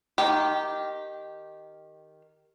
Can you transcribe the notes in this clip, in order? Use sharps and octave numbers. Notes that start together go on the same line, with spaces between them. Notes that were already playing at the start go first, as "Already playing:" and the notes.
D#3 G4